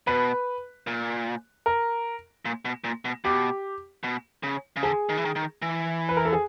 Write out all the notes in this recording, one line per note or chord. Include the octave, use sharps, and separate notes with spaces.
B2 B4
A#2
A#4
A#2
B2
A#2
B2
B2 G4
B2
C#3
C#3
D3 G#4
D#3
E3
D#3
D#3
E3
B4
A#4
A4
G#4